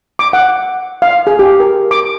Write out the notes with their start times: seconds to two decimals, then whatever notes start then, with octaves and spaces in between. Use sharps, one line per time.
0.19 D6
0.33 F#5
1.02 F5
1.27 G#4
1.39 G4
1.60 A#4
1.91 D6